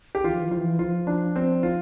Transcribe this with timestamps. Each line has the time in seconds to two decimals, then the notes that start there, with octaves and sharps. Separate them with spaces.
0.15 G4
0.24 E3 F4
0.32 F3
0.40 E3
0.49 F3 F4
0.58 E3
0.79 F3 F4
1.07 D4
1.36 C4
1.63 F4